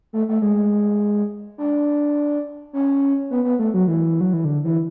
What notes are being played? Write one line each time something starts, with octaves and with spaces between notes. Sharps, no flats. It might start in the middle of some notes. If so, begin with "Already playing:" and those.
A3
A3
G#3
D4
C#4
B3
B3
A3
F#3
E3
F#3
E3
D3
E3